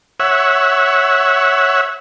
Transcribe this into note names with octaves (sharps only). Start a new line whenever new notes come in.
C#5 E5 F#5